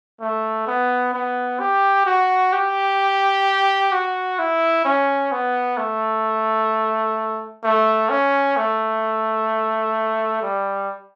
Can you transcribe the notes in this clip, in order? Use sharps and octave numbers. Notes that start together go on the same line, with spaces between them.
A3
B3
B3
G4
F#4
G4
F#4
E4
C#4
B3
A3
A3
C#4
A3
G3